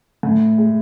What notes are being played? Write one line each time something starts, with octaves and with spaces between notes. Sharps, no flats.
A2
G#3